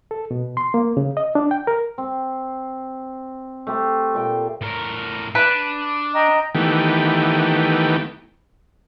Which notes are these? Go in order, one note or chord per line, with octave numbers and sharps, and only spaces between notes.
A4
B2
C6
A#3
C#3
D#5
D4
G5
A#4
C4
A3 G4 C5
A#2 A3 G5
A2 A#4
D4 B4
D#5 G5 A#5
D#3 E3 A3 B3 G4